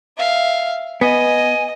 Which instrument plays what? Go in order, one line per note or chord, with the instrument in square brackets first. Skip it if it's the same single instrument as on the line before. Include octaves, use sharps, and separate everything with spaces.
[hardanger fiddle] E5 F5
[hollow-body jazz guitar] B3 [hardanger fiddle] D#5 [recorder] G#5